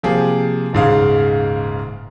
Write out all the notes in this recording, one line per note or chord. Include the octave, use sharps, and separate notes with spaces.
C3 F3 A#3 G4 G#4
D#1 G#2 C#3 F5